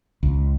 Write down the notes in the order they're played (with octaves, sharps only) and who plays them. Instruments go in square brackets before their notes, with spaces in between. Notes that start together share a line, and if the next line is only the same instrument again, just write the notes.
[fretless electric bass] C#2